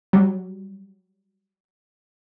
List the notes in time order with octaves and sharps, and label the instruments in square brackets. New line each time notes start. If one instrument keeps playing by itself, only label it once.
[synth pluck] F#3 G3